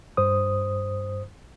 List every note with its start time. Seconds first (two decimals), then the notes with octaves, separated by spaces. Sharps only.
0.17 G2 C5 D#6